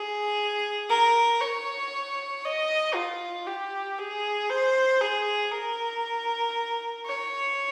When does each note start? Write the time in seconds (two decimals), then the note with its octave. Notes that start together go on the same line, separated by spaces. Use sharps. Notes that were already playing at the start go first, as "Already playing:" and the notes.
Already playing: G#4
0.89 A#4
1.41 C#5
2.44 D#5
2.95 F4
3.47 G4
3.98 G#4
4.49 C5
5.01 G#4
5.52 A#4
7.06 C#5